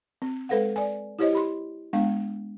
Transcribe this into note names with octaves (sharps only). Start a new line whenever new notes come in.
C4
G#3 A4 B4 C5 F5 F#5
D5 G#5
E4 G4 C5 C#5 D#5
G4 B5 C6
G#3 B3 D4 F5